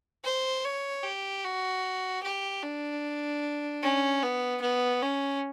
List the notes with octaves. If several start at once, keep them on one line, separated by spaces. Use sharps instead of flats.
C5
C#5
G4
F#4
G4
D4
C#4
B3
B3
C#4